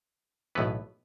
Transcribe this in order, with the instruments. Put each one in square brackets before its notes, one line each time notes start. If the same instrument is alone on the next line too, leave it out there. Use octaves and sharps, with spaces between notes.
[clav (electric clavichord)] B1 A2 E3 B3 B4